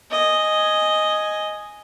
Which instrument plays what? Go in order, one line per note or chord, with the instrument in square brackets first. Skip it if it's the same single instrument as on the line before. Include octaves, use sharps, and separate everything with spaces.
[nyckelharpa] D#5 G#5